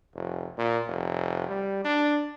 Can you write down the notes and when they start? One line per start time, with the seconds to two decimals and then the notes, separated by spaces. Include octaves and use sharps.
0.15 F1
0.58 A#2
0.88 F1
1.48 G3
1.85 D4